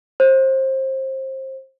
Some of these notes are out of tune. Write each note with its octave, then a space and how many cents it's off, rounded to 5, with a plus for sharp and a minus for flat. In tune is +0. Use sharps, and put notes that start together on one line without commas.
C5 +25